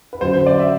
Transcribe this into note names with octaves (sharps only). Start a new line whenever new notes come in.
B4
F#2 D3 F#3 C5
C5
D5
E5